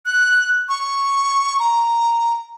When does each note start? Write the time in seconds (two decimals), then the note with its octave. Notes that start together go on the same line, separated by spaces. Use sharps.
0.06 F#6
0.69 C#6
1.59 A#5